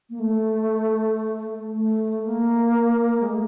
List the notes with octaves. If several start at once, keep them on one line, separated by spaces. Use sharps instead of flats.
A#3
A3
A3
A#3
G#3
A3